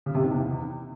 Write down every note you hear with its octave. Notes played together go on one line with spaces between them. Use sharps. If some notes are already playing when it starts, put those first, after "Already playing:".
C#3
C3
D#3
E2